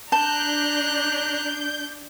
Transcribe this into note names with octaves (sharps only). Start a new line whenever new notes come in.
D4 A5 A#5 F#6 G6